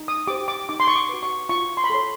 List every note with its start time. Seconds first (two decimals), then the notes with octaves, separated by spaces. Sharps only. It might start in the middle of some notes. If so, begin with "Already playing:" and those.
Already playing: D#4
0.08 D#6
0.27 G4 C5 D6
0.48 D6
0.69 D#4 D6
0.80 C6
0.87 C#6
0.96 D6
1.09 F#4 B4
1.23 C#6
1.49 F4 C#6
1.77 C6
1.84 B5
1.90 A4 C#5 C6